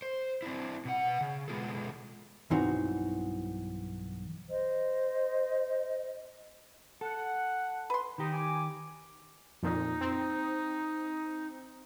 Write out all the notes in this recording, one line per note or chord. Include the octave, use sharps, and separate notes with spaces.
C5
C4 D4 E4
B2 F#5
C#3
B2 G#3 B3 F4 G#4 A4
B1 G2 E3 C4 D#4 F#4
C5 D#5
A4 F#5
B4 C6
D#3 D#4 G4
G#5 D6
F2 A#2 D#4
C4